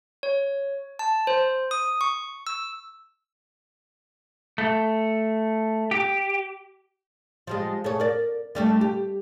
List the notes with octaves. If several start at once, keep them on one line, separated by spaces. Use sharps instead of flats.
C#5
A5
C5
D#6
C#6
E6
A3
G4
F3 G3 G#3
A3 G#4 C#5
A#4 D5
D3 G3 A3
G4